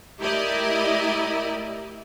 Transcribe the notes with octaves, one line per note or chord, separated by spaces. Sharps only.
A3 E4 G4 A#4 D5 D#5